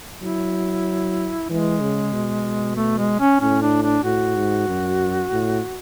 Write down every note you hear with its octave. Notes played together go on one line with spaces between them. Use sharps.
F#3 E4
E3 G#3
C#3
B2
A3
G#3
C#4
A2 C#4
D4
D4
A2 F#4
G#2
F#2
A2